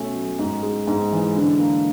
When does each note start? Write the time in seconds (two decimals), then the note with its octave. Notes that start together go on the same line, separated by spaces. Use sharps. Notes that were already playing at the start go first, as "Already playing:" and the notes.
Already playing: B2 A3 C#4
0.15 F#3
0.39 G#2
0.63 G#3
0.87 G#2
1.12 E3
1.35 D3
1.59 A#3